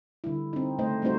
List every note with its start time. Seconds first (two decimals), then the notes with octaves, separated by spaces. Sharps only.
0.24 D3 G3 E4
0.53 C4 D#4
0.79 C#3 A3 C5 D#5
1.02 G3 A3 C4 D#4 F#4 C5